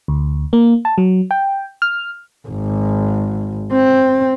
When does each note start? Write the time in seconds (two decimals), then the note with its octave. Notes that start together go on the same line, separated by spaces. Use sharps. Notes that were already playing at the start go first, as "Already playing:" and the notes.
0.08 D2
0.53 A#3
0.85 A5
0.98 F#3
1.31 G5
1.82 F6
2.48 G#1
3.72 C4